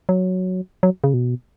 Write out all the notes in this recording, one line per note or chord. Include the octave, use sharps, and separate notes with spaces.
F#3
F#3
C#3
B2